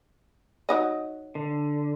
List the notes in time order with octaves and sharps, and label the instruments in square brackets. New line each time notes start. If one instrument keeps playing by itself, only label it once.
[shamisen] F#3 D#4 D#5
[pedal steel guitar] D3